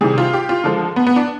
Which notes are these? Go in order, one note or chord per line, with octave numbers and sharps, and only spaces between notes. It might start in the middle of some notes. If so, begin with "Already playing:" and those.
C3 D#3 G3 G#4
F4
G4
F4
D3 F3 G#3
B3
B3
D4